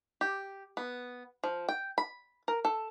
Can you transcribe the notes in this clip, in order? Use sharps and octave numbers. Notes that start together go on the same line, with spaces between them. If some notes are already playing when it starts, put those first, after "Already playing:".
G4
B3
F3
G5
B5
A#4
A4